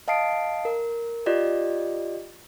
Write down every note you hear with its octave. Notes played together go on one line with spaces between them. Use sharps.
D#5 F5 A5 D#6 C7 D7
A#4
F4 G4 D5 D#5